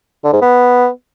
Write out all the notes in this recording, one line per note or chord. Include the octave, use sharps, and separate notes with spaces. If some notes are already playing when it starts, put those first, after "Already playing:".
D3
G#2
B3